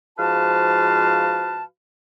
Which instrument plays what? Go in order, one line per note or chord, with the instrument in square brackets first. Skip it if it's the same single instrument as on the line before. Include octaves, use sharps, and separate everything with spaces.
[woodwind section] G#2 F3 F#4 B4 F5 A5